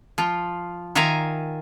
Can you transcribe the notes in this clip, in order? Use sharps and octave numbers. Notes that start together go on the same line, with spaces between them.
F3 F4
D#3 F4 E5 F5 G#5 A#5